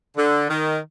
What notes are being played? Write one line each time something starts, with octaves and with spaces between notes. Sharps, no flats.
D3
D#3